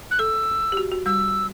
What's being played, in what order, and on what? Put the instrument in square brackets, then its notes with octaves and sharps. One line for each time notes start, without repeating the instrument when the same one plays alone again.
[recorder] F#6
[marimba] A4 [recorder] E6
[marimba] G4
F#4
F#4
[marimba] G3 [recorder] E6